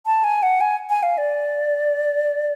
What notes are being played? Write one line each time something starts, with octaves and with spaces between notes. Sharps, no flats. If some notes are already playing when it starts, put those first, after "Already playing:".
A5
G#5
F#5
G#5
G#5
F5
D5